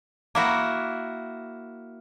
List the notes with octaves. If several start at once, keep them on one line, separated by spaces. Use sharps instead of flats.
A#3 E4 F#4